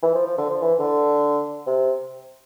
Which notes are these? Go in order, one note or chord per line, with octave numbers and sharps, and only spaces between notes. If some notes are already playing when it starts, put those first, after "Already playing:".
E3
F3
F3
D3
F3
E3
D3
C3